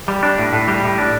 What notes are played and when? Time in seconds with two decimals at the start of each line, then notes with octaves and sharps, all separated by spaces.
0.08 G3
0.23 D4
0.38 A2
0.53 A2
0.68 G3
0.84 A2
0.98 D4